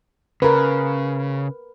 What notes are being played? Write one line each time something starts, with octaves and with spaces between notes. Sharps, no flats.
C#3 A#4 B4